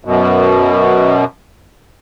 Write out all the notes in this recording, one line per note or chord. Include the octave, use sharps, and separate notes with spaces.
F#2 B2